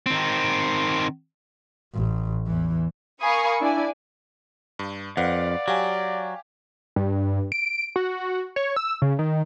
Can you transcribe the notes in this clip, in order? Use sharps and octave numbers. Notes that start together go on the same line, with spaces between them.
D#3 C4
A1
E2 E3
A#4 F5 G#5 B5 C#6 D#6
D4 E4 D5 G#5
G2
F2 B4 D5 F5 F#5
F#3 G4 F5 G#5
G2
D7
F#4
C#5
E6
C#3
D#3